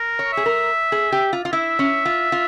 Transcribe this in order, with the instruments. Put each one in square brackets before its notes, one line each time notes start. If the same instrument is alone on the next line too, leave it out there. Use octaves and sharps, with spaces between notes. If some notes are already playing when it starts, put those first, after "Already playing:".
Already playing: [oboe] A#4
[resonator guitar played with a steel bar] C#5
[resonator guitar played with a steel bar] G#4 [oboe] E5
[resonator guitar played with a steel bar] A#4
G#4
G4
F4
F4
[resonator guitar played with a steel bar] E4 [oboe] E5
[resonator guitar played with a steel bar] C#4
F4
F4